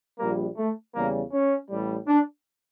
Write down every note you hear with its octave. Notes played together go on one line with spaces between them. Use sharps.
A#1 A#2 G3 A#3
A3
E2 C#3 G3 A#3
C#4
A1 A2 G3
D4